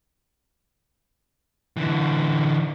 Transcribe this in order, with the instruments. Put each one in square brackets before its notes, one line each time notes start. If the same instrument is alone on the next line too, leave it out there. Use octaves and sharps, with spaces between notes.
[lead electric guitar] D3 E3